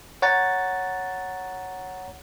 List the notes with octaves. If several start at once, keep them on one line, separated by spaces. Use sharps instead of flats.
C#5 F#5 A#5 A6